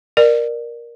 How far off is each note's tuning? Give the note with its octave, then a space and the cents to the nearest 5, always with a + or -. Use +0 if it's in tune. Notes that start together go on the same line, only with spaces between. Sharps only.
A#4 +10 D5 +25